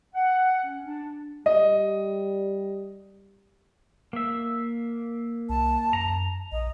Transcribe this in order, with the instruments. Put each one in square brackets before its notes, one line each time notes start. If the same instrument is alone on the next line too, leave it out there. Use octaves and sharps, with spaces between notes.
[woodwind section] F#5
C#4
D4
[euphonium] G3 [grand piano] D#5
[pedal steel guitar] A#3 E5
[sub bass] C2 [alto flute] A5
[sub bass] F#2 [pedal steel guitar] A#5
[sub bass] A#1 [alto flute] D#5